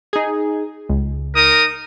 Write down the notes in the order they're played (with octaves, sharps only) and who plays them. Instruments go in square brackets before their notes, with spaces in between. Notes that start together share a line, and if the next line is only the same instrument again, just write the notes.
[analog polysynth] D#4 G#4
C#2
[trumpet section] D#4 A#4 D#6